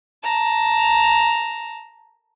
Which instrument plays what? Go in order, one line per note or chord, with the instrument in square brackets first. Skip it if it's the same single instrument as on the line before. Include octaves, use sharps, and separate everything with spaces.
[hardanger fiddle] A5 A#5